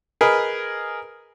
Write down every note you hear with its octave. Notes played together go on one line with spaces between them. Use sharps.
G#4 A#4 B4 D#5